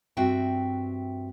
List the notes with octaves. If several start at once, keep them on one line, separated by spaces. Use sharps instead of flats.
G2 C4 F#4 E5 G5